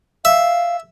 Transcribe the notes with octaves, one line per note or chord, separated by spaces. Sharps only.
E5 F5